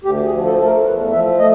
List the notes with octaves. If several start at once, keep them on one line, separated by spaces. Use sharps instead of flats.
D2 G4
G#4
F3
A4
A3 A4
A#4
A#4
E2 B4
F3 E5
A3 D#5